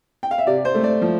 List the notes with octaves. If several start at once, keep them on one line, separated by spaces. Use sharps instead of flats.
G5
F5
E5
C3 D5
C5
A3
D5
F3